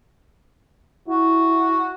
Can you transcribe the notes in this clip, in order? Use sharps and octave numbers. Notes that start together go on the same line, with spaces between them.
E4 F#4